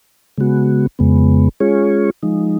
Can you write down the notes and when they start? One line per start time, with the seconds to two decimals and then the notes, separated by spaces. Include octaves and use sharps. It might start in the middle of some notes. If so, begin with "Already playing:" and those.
0.37 C#3 G#3 B3 F#4
0.99 F2 C#3 G#3 B3
1.60 G#3 C#4 F4 G#4 C#5
2.23 F3 G#3 D#4